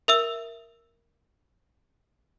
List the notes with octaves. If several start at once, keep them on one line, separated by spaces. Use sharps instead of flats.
A#4 E5 E6